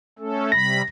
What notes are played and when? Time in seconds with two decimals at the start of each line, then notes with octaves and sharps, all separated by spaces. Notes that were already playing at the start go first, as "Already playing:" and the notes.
0.19 A3 C#4 A4
0.52 C3 G3 B5 A#6